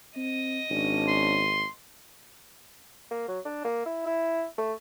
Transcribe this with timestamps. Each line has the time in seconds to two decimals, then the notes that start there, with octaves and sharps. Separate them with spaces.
0.16 C4 D#5
0.71 G#1 C#4 D4
1.08 C6
3.11 A#3
3.28 F#3
3.45 D4
3.64 A#3
3.86 E4
4.06 E4
4.58 A3